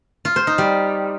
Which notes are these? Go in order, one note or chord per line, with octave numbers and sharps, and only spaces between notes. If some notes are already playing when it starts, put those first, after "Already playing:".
F4
C5
D#4
G3